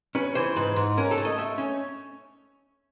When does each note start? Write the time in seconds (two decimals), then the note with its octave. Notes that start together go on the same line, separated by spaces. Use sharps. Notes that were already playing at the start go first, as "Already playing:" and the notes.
0.15 C#4 B4
0.35 E3 C5
0.56 G#2 B4
0.76 G#2
0.97 C#4 A#4
1.11 A4
1.18 A3
1.25 D#5
1.38 A3 E5
1.58 C#4